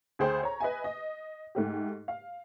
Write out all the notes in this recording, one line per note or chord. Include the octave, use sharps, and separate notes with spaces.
D2 G#4 C5 G5
C#5 A#5
B4 D#5 E5 G#5
D#5
G#2 A3 G4
F5